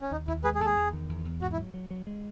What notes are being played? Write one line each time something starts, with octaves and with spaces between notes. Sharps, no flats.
C#4
D#2 D#4
D#2 E4
G#3 G#4 B4
G#4
D#2 A4
G#4
E2
D#3
E2
E2
G#2 F#4
E4
F#3
F#3
F#3
G#3